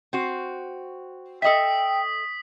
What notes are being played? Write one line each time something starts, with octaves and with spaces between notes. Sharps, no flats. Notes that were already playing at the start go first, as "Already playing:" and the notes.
C4 F#4
A4 D#5 E5 G5 D#6 B6